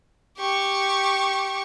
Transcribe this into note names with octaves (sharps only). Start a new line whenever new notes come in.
G4 C#6